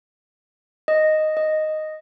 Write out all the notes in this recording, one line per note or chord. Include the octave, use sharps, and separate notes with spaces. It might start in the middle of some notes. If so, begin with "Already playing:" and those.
D#5
D#5